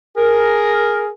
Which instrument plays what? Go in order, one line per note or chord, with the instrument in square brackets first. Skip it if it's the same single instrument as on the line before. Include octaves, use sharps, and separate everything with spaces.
[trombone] G#4 [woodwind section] A#4